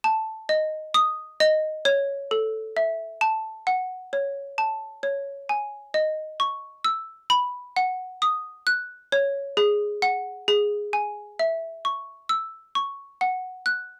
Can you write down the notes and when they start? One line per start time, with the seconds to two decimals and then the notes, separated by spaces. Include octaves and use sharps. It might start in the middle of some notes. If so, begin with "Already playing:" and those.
0.04 A5
0.49 D#5
0.94 D#6
1.40 D#5
1.85 C#5
2.31 A4
2.77 E5
3.21 A5
3.67 F#5
4.13 C#5
4.58 A5
5.03 C#5
5.49 G#5
5.94 D#5
6.40 C#6
6.84 E6
7.30 B5
7.76 F#5
8.22 D#6
8.67 F#6
9.12 C#5
9.57 G#4
10.02 F#5
10.48 G#4
10.93 G#5
11.39 E5
11.85 C#6
12.29 E6
12.75 C#6
13.21 F#5
13.66 F#6